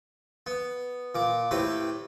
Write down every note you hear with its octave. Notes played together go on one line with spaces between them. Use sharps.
B3
A#2 D6
A2 C4 G4 B4